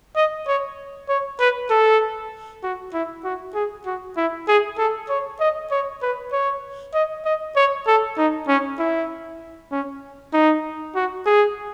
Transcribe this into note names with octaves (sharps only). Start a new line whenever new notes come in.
D#5
C#5
C#5
B4
A4
F#4
E4
F#4
G#4
F#4
E4
G#4
A4
C#5
D#5
C#5
B4
C#5
D#5
D#5
C#5
A4
D#4
C#4
E4
C#4
D#4
F#4
G#4